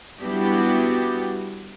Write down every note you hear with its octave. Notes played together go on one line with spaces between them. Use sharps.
G3 B3 D4 E4 F#4 G4